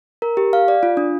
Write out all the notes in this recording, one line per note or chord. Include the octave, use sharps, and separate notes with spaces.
A#4
G4
F5
D5
F4
D4